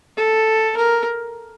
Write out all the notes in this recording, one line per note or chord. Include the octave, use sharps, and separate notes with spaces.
A4
A#4